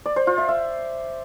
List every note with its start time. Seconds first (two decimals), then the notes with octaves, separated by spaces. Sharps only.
0.06 D5
0.16 C5
0.27 F4
0.38 E5
0.49 E5